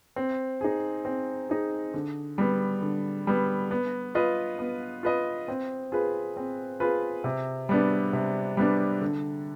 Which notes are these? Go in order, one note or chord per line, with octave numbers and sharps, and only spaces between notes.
C4
D#4 G#4
C4
D#4 G#4
D3
G3 B3
D3
G3 B3
B3
F4 B4 D#5
B3
F4 B4 D#5
C4
F4 G#4 B4
C4
F4 G#4 B4
C3
G3 B3 D4
C3
G3 B3 D4
D3